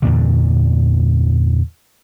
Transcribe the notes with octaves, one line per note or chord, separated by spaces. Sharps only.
E2 G2 A#2 D3